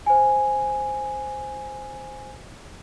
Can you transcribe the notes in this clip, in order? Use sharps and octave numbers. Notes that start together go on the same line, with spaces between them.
C5 G#5